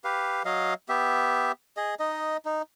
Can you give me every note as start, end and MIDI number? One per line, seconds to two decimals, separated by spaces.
0.04 0.43 67
0.04 0.43 71
0.04 0.43 77
0.45 0.74 54
0.45 0.74 75
0.45 0.74 77
0.89 1.52 59
0.89 1.52 67
0.89 1.52 76
1.77 1.95 68
1.77 1.95 75
2.00 2.37 63
2.00 2.37 75
2.45 2.62 63